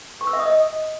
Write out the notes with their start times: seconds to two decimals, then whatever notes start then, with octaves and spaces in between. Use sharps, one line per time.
0.21 C#6
0.27 E6
0.33 E5
0.40 D#6
0.46 D#5